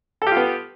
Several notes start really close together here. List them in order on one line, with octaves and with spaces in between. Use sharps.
A4 G4 F4 B3